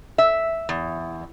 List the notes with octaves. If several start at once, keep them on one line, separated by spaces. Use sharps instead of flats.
E5
E2